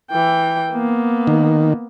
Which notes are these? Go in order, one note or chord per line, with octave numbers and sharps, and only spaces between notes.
E3 G5
A#3 B3
D#3